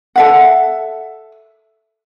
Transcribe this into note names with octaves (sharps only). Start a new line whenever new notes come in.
A4 E5 F#5